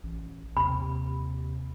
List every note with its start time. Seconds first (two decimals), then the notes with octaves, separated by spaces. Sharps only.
0.03 A1
0.57 D#2 C3 B5